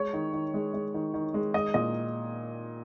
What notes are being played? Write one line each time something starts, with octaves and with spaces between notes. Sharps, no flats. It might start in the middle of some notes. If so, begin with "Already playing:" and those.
Already playing: G#3 C#5
D#3
D#3
G#3
G#3
D#3
D#3
G#3
G#3 D#5
A#2 D#5